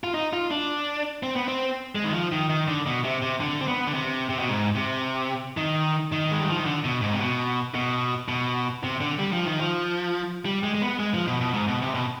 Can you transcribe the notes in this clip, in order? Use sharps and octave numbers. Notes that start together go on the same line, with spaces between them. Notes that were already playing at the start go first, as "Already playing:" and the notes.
F4
D#4
F4
D4
C4
B3
C4
G#3
D#3
F3
D#3
D#3
D3
B2
C3
C3
D3
C4
B3
D3
C3
C3
B2
G#2
C3
D#3
D#3
G#3
G3
F3
D#3
D3
B2
G#2
C3
B2
B2
B2
C3
D3
G3
F3
D#3
F3
G3
G#3
G#3
B3
G#3
F3
B2
B2
G#2
B2
C3
B2